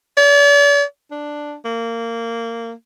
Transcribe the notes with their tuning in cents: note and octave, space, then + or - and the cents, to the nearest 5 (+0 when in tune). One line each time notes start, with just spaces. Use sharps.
D5 -40
D4 +5
A#3 -20